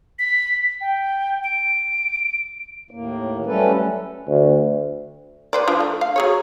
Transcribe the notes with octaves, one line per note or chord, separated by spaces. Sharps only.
B6
G5
D7
D#2 A2 A#3
F#3 G3 A3 C#4 A4 B4
D2
B4 C5 D5
F3 D4 F4
A3
F5
F#3 G#4 C#5